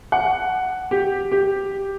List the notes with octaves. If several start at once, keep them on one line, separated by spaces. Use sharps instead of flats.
F#5
G4
G4